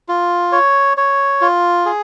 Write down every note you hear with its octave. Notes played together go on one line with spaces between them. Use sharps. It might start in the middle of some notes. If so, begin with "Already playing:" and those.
F4
C#5
C#5
F4
G#4